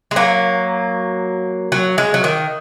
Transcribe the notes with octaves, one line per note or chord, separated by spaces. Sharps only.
G#3
F#3 A#3
F#3
G#3
F#3
D#3